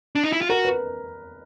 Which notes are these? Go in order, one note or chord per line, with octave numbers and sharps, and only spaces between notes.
D4
D#4
E4
F4
F#4 A#4
B4